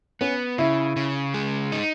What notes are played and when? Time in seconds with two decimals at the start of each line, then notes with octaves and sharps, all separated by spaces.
0.21 B3 C#4
0.58 C#3 E4
0.96 C#3
1.34 G#3
1.72 D#4